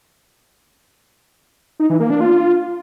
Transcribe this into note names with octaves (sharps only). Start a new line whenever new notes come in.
D#4
E3
A#3
D4
F4